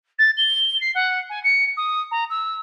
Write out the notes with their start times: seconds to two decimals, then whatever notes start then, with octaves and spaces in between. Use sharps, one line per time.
0.18 A6
0.37 G7
0.81 C7
0.94 F#5
1.29 G#5
1.43 C#7
1.76 D#6
2.11 A#5
2.30 E6